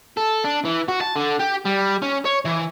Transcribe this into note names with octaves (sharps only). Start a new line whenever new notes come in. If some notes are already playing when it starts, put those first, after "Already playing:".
A4
D4
E3
F#4
A5
D3
G4
G3
C#4
C#5
E3